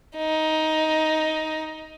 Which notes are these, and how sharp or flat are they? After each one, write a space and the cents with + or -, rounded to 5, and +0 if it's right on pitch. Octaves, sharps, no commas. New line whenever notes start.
D#4 +10